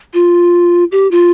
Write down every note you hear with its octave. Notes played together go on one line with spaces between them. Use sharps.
F4
G4
F4